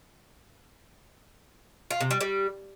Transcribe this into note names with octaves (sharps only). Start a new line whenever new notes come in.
F4
C3
G3
G3